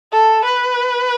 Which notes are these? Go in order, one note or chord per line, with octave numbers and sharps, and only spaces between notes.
A4
B4